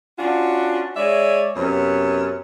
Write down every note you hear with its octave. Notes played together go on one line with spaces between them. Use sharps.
C#4 D4 F4 F#4
G#3 C#5 D5 E5
F#2 C3 B3 C#5